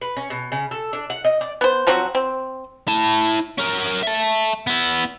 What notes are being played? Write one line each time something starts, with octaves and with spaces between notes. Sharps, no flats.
B4
C#4
B2
C#3
A4
D4
F#5
D#5
D5
B3 C5
F3 F#3 C4 F#4
C4
E4 A5
C#4 A#4
E5 A5
B3 E4